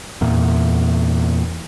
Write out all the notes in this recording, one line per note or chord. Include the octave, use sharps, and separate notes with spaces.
E2 A#2